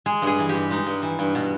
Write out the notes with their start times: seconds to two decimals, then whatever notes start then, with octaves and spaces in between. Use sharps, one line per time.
0.06 G#3 G#4
0.22 G2 G#4
0.39 E3
0.49 G2 G4
0.70 G#3 D#4
0.87 G2
1.02 E3
1.19 G2
1.35 B2